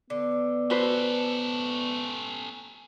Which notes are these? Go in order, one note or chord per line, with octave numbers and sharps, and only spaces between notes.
D3 B3
C#4 F#4 A4 B4 C5